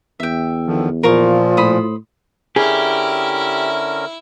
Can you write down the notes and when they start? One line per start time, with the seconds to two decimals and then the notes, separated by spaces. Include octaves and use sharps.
0.20 E2 E5 G5
0.67 D3 D#3 F3
1.03 A#2 F3 F4 A#4 F5 C#6
1.57 A2 C5 B5 D#6
2.56 D3 C#4 E4 G4 G#4 A#4 E5